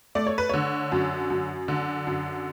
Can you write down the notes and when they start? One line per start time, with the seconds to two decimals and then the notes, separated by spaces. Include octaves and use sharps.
0.15 A3 D5
0.27 C#5
0.38 B4
0.49 D3 C#5
0.92 F#2
1.30 F#2
1.68 D3
2.07 F#2